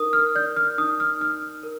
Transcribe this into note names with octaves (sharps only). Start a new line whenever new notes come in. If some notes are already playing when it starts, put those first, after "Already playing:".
Already playing: D#4 A#4 D#6
F6
D5 G6
F6
D#4 D#6
F6
D#4 F6
A#4